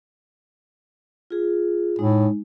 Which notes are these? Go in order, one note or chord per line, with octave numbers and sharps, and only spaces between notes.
F4 G#4
A2 G#3 D#4